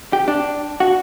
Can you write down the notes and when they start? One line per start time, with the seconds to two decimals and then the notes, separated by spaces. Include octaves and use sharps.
0.13 G4
0.28 D4
0.80 F#4